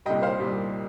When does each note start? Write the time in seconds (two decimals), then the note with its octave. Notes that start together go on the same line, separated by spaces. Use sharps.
0.05 C2 A#2 G3 D#5 G5
0.22 C5 F5
0.39 C2 A#2 G3